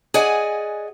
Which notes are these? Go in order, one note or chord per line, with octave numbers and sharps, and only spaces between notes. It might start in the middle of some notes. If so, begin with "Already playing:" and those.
G#4 D5 D#5 F#5 G#5